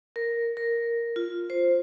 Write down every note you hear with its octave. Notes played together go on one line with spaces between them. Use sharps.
A#4
A#4
F4
C5